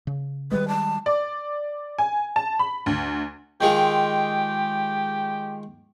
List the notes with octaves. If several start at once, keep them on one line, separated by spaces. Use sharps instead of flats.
C#3
D#3 G3 G#3 B4
A5
D5
G#5
A5
B5
D2
D#3 G#3 F4 G4